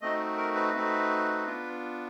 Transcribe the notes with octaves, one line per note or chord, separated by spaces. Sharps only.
A3 C4 D#4 F#4 D#5
A#4
B4
A3 C4 D#4 F#4
B3 D4 F4